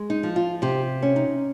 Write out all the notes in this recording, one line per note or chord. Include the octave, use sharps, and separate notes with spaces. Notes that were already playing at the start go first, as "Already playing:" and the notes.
Already playing: G#3
D#4
F3
F4
C3 G4
C#4
D#4